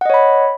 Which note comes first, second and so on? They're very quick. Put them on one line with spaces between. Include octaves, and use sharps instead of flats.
F#5 D#5 C#5 B5